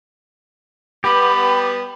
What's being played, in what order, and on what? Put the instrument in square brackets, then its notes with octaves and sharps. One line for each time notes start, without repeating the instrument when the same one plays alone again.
[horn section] G3 B3 [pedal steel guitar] G4 [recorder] B5